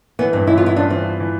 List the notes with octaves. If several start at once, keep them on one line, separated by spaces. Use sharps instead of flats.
E3 B3
G2 C4
E3 E4
F4
B3 E4
D4 F4
E3 C4
F4
E3